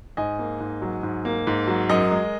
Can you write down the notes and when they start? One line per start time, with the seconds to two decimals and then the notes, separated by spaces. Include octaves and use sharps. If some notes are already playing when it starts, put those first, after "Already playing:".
0.17 G#2 D#5 G#5
0.39 A#3
0.60 G#2
0.82 F#3
1.03 G#2
1.25 A#3
1.47 G#2
1.67 F#3
1.89 F#2 A#4 D#5
2.11 G#3